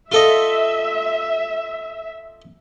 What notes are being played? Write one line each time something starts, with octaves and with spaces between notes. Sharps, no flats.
F4 A4 D#5 E5